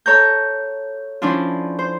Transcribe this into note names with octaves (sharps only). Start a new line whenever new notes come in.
A4 C#5 A#5 G6
F3 C#4 D4 E4 F4
C5